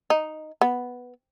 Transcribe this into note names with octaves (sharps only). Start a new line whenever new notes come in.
D#4
B3